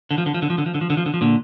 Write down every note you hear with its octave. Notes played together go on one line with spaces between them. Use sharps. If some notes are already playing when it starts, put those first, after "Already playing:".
D3
F3
D3
F3
D3
F3
D3
F3
D3
F3
D3
F3
D3
F3
A#2 D3